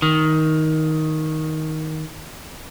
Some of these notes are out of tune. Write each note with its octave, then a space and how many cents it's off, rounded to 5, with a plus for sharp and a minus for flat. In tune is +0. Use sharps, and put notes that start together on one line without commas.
D#3 +10